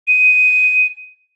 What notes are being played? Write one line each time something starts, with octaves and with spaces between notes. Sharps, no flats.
D#7